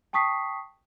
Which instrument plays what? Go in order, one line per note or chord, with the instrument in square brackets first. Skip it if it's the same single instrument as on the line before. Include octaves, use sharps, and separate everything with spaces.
[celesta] G5 A5 C#6 D#6 B6 C7